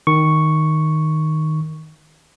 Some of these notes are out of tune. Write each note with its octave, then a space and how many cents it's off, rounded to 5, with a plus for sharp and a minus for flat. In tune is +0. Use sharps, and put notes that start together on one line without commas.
D#3 +0 C#6 +0